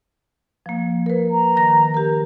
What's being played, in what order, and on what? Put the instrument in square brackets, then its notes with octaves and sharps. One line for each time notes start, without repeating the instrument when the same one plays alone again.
[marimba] F3 A#3
A#4 B4
[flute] A#5
[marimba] D#3 A#6
G4 A#4